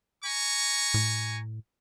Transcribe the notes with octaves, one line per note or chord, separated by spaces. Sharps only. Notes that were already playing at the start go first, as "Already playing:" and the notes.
G#5 A#5 C#6
A2